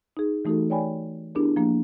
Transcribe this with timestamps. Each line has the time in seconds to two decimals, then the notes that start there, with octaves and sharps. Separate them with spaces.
0.17 D#4 G#4
0.45 E3 A3 D#4 F#4 G4 A4
0.70 C#5 D5 G5 G#5 B5
1.35 B3 D4 E4 G4 G#4 A#4
1.56 F3 A#3 D4